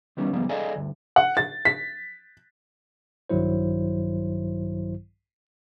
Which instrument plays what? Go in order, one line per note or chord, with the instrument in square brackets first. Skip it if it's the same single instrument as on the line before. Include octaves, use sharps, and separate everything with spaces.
[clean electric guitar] D#3 E3 G3 B3 C#4
D2 G#2 F3 G3 G#3 B3
G#4 A4 D5 D#5 F5 G#5
D2 G2
[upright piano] F#5
A6
B6
[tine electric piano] A#1 G2 D#3 F#3 E4 C5